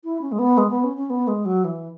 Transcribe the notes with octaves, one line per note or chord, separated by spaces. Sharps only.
E4
C#4
G#3
B3
G#3
B3
C#4
C#4
B3
G#3
F#3
E3